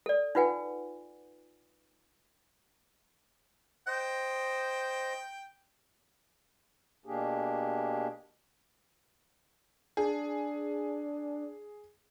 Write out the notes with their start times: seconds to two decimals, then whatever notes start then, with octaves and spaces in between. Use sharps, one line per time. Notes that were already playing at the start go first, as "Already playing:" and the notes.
0.06 A4 D5
0.35 D#4 F4 B4 F#5 G#5
3.87 C5 D#5 G5
7.06 B2 A#3 D4 G4 G#4
9.97 D4 G#4